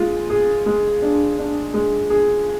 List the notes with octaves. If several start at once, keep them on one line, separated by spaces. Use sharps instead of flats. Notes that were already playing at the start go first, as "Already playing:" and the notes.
Already playing: G#3 F4
G#4
G#3
D4
D4
G#3
G#4